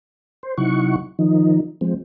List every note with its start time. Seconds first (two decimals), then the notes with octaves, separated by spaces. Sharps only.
0.43 C5
0.58 C3 F#3 D#4 E4 F#5 C#6
1.19 D#3 F3 D#4
1.81 F3 G#3 C4